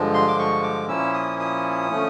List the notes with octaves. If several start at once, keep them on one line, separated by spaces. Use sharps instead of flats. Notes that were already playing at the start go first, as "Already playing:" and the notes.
Already playing: G2 D3 F3 G#3
C6
D6
C#6
D6
A#2 F3 A#3 C#4 E4 E6
D#6
D#6
D3 F3 A3 C#4